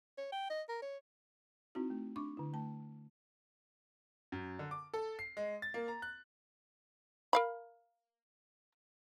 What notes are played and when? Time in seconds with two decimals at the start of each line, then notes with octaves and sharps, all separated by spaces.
0.18 C#5
0.32 G5
0.50 D#5
0.69 A#4
0.82 C#5
1.75 C4 D#4 E4 F#4
1.90 A3
2.16 D4 C#6 D6
2.37 D3 E4
2.53 A3 A5
4.32 F#2
4.59 D3
4.71 D6
4.94 A4
5.19 C7
5.37 G#3
5.62 A6
5.74 A#3
5.88 A#5
6.02 F#6
7.33 A#4 F5 B5